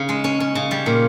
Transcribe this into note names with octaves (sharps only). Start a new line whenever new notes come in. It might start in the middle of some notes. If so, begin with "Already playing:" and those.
Already playing: C#3
G#3
C#4
C#4
C#3
G3
A#2